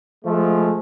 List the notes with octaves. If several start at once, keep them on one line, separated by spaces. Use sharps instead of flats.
F3 G#3 A3